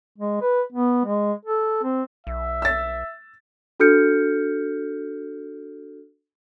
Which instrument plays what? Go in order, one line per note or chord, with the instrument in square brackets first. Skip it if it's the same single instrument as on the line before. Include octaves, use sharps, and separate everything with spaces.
[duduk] G#3
B4
B3
G#3
A4
C4
[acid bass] B1 [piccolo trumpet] E5
[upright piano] E6 A6
[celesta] D4 F#4 A4 F6 G6 C#7